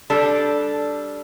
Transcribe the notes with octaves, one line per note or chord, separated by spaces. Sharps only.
G3 D4 A4